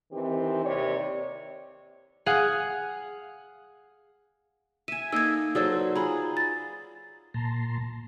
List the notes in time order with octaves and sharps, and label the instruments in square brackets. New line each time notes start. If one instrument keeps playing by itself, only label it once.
[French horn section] D#3 E3 C4 G4
D#2 C3 C#5 D5
[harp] G#4 F5 F#5
[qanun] E5 G#5 [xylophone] D#7
[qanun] A#3 D#4 A4 [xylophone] E6 G#6
[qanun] F#3 A4 C5 [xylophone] G#4 D5 E6
[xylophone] B4
[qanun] F4 G#4 [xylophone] A#5 B5
[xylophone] A6
[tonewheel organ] A#2 A5 A#5 C6